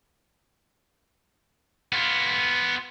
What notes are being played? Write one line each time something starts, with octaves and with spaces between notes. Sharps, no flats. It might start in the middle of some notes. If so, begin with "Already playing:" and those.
B3 F4